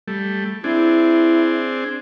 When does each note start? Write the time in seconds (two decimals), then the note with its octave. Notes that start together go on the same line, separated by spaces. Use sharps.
0.08 G3 A3
0.64 C4 D4 E4 G#4